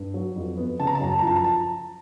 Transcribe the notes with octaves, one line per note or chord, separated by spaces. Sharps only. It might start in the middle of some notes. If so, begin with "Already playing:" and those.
Already playing: G2
F#3
F2
B3
C#3 A5
A#5
A5
F#2 A#5
A5
A#5
F3 A5
A#5
A5